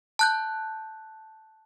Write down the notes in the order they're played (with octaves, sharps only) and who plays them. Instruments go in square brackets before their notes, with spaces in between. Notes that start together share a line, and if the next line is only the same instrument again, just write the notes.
[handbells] A5 F#6 G6